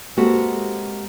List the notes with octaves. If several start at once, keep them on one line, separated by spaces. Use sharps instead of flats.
G#3 A#3 C4 F#4 G4 A4